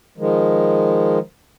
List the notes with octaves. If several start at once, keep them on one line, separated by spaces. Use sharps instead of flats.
D#3 F3 G#3